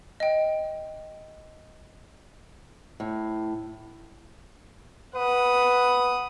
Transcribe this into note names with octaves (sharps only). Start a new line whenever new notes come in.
D#5 G5
A2
B4 F#5 D#6